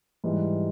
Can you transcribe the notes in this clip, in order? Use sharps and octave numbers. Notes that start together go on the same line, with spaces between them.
G#2 E3 G3